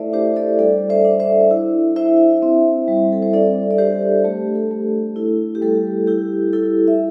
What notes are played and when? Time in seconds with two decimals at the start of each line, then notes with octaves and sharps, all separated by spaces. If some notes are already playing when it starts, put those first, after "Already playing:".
Already playing: A3 E4 A4 C5 D5 E5
0.13 D4 G4 C5
0.36 A4 D5
0.59 G3 A4 D5
0.90 C5 E5
1.05 D4
1.20 C5 E5
1.51 E4
1.96 E4 C5 E5
2.42 C4
2.87 G3
3.12 A4
3.22 C5
3.33 D4 A4 D5
3.71 D5
3.78 D4 G4 C5
4.24 A3 G4
4.55 A4
4.71 A3
5.16 E4 A4
5.55 G4
5.62 G3 A4
6.07 E4 G4
6.53 E4 A4
6.87 E5